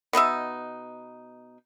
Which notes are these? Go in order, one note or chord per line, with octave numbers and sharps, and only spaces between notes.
B2 B3 D#4 E5